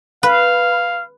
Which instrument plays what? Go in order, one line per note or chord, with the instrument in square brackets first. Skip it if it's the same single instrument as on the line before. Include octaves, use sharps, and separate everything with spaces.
[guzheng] B4 [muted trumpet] F5